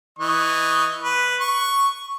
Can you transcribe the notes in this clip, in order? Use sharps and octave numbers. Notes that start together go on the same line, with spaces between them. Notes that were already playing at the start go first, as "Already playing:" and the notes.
E3 D#5 C#6
B4
C#6